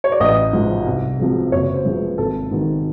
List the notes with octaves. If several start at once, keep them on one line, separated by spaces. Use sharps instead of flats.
C#5
D5
A1 D#5
G#2 F3
C2
C3 F3 G#3
F#1 C#5
C5
F#2 C#3 F3 G#3
B4
G#1 A4
G#2 D#3